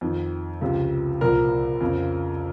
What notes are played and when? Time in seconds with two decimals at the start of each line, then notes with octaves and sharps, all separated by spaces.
0.01 F2 D#3
0.61 C#2 C3 F3
1.21 C2 A#2 F3 A#4
1.81 F2 C#3 F3